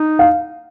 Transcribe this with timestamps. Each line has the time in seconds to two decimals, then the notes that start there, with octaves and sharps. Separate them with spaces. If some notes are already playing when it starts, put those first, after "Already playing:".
Already playing: D#4
0.19 F5